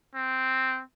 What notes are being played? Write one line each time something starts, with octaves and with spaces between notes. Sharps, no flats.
C4